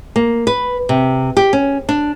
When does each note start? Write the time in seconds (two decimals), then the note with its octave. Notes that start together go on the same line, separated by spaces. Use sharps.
0.16 A#3
0.47 B4
0.89 C3
1.37 G4
1.53 C#4
1.89 D4